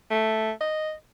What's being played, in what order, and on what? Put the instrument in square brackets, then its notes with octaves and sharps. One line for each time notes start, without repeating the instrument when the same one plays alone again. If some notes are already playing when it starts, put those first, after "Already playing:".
[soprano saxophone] A3
D#5